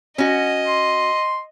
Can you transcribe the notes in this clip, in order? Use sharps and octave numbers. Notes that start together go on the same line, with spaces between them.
C#4 F#4 D#5
C6